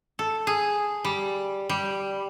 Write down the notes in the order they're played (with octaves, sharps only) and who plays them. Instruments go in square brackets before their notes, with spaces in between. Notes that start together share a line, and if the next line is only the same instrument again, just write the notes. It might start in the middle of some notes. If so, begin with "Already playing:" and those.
[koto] A4
G#4
G3
G3